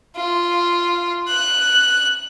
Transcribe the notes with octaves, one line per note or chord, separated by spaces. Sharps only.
F4
F#6